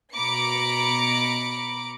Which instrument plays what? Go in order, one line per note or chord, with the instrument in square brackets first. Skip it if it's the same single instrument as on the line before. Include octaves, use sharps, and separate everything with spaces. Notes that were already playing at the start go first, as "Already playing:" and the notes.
[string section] B2 A#5 B5 D6 C#7